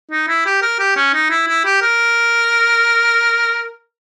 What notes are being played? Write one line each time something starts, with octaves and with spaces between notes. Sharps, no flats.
D#4
E4
G4
A#4
G4
C#4
D#4
E4
E4
G4
A#4